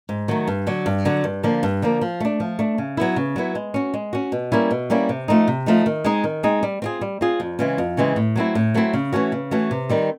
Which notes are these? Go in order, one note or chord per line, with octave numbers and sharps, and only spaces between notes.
G#2
D#3 F#3 A3
G2
D3 F#3
G2
D3 F#3
G2
D3 F3 A#3
G2
D3 F3 A#3
F3
A3 D4
F3
A3 D4
C#3
F#3 B3 E4
C#3
F#3 B3 E4
G#3
C#4 F#4
G#3
C#4 F#4
B2
G3 A#3 C#4 E4
B2
G3 A#3 C#4 E4
C3
F3 A3 C4 D#4
C3
F3 A3 C4 D#4
D#3
G#3 C4 D#4 G#4
D#3
G#3 C4 D#4 G#4
G3
C4 F4 G#4
G3
C4 F4 G#4
F2
C#3 E3 G#3 C4
F2
C#3 E3 G#3 C4
A2
F#3 A3 C4 E4
A2
F#3 A3 C4 E4
C#3
E3 A3 C#4 F#4
C#3
E3 A3 C#4 F#4
C3
D#3 G3 C4